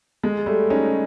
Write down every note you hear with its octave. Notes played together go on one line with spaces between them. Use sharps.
G#3
G3 A3
C#4 D#4